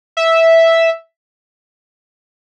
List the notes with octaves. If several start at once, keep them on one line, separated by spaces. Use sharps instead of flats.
E5